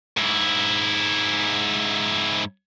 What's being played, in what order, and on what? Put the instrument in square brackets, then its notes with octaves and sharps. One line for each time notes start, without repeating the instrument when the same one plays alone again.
[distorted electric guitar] G#2 E4